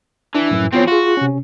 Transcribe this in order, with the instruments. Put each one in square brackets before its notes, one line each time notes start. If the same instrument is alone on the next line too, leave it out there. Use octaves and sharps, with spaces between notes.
[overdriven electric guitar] E3 [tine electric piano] D4
[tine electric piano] F#2 A2
[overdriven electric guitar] E2 C4 [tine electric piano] B3 F4 C#5
[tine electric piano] F4 G#4 [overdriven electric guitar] F#4
[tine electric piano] C3 C#4